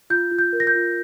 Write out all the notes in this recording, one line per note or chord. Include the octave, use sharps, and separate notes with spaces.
F4 G6
F4
G6
A#4
A#6
G6
F4